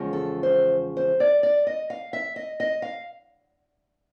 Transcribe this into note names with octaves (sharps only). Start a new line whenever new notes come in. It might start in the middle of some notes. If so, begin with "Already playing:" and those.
Already playing: E2 C#3 F3 G#3
A4
C5
C5
D5
D5
D#5
F5
E5
D#5
D#5
F5